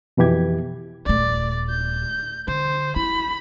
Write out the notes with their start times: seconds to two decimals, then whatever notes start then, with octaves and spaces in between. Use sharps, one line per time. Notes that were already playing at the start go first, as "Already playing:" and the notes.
0.17 F2 B2 E3 G4 G#6
1.06 D#1 A3 D5
1.69 G6
2.48 D3 C5
2.96 E4 B5